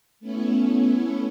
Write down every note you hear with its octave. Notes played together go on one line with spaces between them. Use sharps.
A3 B3 C#4 E4 C#5